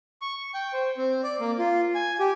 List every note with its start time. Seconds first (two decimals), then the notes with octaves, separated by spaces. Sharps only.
0.22 C#6
0.54 G5
0.73 C5
0.97 C4
1.23 D5
1.40 A#3
1.59 F4
1.95 G#5
2.20 G4